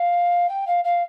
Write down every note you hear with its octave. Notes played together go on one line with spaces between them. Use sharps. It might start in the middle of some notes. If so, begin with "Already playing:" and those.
Already playing: F5
G5
F5
F5